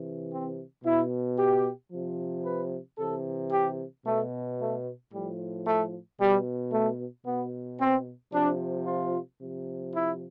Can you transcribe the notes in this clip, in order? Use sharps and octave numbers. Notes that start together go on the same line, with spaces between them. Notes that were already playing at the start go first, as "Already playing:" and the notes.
Already playing: C3 E3
C4
B2 E4
G4
C3 F3
B4
C3 E3 A4
G4
B2 A3
A3
A2 F3 G3
A3
B2 G3
A3
B2 B3
C4
C3 F3 D4
F4
C3 F3
E4